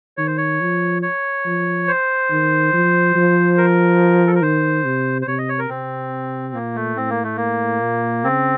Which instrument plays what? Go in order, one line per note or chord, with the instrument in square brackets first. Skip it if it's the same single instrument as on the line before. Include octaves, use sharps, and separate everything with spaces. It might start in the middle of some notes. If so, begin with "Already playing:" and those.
[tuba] D#3 [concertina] C#5
[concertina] C5
C#5
[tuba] F3
[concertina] C#5
[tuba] F3
[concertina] C5
[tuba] D#3
F3
F3
[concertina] A#4
A4
A#4
[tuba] D#3 [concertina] C5
[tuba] C3
[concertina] C5
[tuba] C3 [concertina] C#5
[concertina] D#5
C#5
A#4
[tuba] C3 [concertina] C4
[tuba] A#2 [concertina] A#3
[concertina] A3
[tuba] A2 [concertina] C4
[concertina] A#3
A3
A#3
[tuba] A#2
[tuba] C#3 [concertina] C4